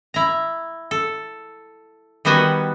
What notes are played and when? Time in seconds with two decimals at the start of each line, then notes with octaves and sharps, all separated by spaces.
0.14 E4 A#5
0.91 A4
2.25 D#3 G3 B3 F#4 G#5